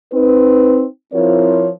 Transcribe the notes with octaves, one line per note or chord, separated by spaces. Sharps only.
C4 D#4 B4
F3 C4 E4 F4 A#4 C#5